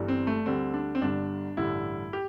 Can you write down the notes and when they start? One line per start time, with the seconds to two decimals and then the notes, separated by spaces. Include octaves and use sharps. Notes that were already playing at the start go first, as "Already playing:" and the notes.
Already playing: G1 G2 E3 G3
0.08 C4
0.27 A3
0.46 D2 D3 G3 C4
0.74 D4
0.95 C4
1.01 G1 G2 D3 G3 D4
1.57 A1 G2 D3 G3 E4
2.13 G4